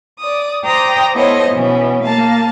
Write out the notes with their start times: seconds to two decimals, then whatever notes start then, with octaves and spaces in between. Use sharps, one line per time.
0.19 D5 D#6
0.65 C5 D5 G5 A#5 D#6 A#6
1.14 B3 E4 A4 C5 C#5 D#5
1.50 B2 E3 B3 C#4
2.02 A#3 F5 A5